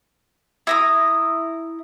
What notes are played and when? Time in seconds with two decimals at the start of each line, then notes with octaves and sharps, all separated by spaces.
0.67 E4 A#5 D#6